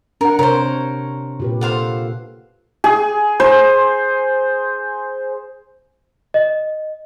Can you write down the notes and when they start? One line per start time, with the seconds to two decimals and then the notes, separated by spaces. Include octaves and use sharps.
0.21 D4 A#4 F#5
0.39 C3 A#4 C5 C#5
1.40 A#2 G4 B4
1.61 A4 C5 F5 F#5
2.84 G#4
3.40 C5
6.34 D#5